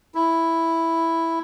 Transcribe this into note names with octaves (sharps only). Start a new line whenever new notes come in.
E4